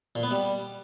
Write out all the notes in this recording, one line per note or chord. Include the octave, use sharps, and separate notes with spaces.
A#2
B3
G3